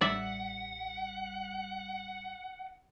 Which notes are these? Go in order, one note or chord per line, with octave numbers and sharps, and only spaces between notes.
A1 G3 D5 E5 F#5 B6